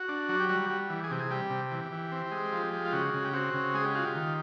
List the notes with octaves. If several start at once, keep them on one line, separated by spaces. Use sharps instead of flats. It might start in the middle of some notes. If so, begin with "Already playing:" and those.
Already playing: F#4
D4
F#3
G4
G3 F#4
G3
E3
G#4
C3 G4
G#4
G3 G4
C3
E3
E3
C4
G#3
F3
G#3
F4
C#3 F#4
C#3
G4
C4 F#4
C#3
G#3 G#4
G4
F4 F#4
G4
D#3